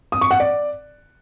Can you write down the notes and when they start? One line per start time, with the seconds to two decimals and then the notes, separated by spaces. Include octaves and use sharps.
0.12 D#6
0.21 C#6
0.31 F#5
0.40 D5